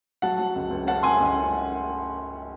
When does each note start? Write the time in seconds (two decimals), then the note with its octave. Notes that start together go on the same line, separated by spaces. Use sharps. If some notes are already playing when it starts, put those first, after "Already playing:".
0.22 F#3 F#5 A5
0.39 F#3
0.56 C#2
0.71 C#2
0.87 C#4 F#5 A5
1.03 C#4 G#5 C6
1.20 C#2